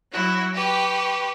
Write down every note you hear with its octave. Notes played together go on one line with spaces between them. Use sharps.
F#3 E4 F#4
G4 B4 C#6